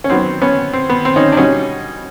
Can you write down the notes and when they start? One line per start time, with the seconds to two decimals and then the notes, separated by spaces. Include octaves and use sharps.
0.04 C#4
0.10 F#2 D#3 F#3 B3 C4
0.42 B3 C#4
0.73 C4
0.89 B3
1.05 C4
1.16 C#4 D#4
1.32 D4
1.37 B2 G3 C#4 D#4